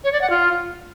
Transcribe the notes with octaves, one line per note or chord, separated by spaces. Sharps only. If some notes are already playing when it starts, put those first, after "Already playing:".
C#5
D5
F#5
F4